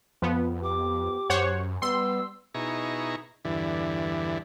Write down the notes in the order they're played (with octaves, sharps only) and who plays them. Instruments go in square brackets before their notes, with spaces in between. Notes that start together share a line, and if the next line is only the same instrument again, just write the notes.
[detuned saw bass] F2 [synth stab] F3 B3
[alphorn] G4 [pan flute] D6
[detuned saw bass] F#2 [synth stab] C5 C#5 F#5
[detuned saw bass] G3 [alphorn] B3 [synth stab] C6 [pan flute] E6
[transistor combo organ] B2 D#4 E4 G#4 A#5 C#6
E2 G2 D3 E3